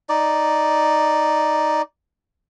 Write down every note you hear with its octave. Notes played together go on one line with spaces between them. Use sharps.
D#4 D5